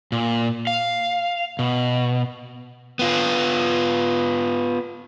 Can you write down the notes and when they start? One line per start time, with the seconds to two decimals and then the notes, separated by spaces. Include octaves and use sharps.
0.12 A#2
0.67 F5
1.59 B2
2.99 B3 F4